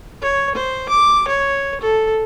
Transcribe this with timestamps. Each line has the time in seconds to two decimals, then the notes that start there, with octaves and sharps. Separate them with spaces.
0.22 C#5
0.55 C5
0.89 D6
1.28 C#5
1.81 A4